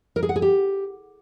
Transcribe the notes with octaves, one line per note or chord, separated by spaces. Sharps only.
A#4
G#4
F#5
G#4
G4